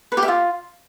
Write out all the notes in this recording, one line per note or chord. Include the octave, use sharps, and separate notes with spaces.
B4
G4
E5
F4